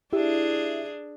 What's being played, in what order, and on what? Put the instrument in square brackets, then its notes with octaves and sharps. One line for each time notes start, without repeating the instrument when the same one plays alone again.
[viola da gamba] D4 G#4 [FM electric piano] E4 G4 E5